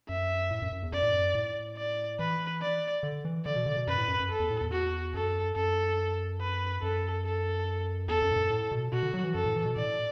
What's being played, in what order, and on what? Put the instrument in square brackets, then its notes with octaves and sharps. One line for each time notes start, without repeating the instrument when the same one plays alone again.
[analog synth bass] F#2 [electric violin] E5
[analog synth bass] A2
F#2
F#2
E2
[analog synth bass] F#2 [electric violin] D5
[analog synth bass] A2
F#2
A2
[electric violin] D5
[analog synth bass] E3 [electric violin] B4
[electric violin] D5
[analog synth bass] D3
E3
[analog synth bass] D3 [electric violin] D5
[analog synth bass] B2
D3
B2
[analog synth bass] F#2 [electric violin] B4
[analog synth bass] A2
F#2
F#2
[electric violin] A4
[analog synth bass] E2
A2
E2
[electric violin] F#4
[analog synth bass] F#2 [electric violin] A4
[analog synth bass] F#2 [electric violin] A4
[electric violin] B4
[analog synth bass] F#2 [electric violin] A4
[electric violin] A4
[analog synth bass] E2 [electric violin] A4
[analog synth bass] F#2
A2
F#2
A2
B2
[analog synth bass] B2 [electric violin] F#4
[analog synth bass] D3
F#3
E3
[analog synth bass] F#2 [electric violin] A4
[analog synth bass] A2
E3
B2
[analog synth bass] A2 [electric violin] D5